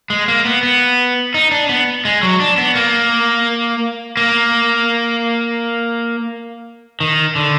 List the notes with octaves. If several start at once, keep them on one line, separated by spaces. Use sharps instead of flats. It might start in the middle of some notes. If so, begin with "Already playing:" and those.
G#3
A#3
B3
B3
D#4
D4
B3
G#3
F#3
D4
B3
A#3
A#3
D#3
D3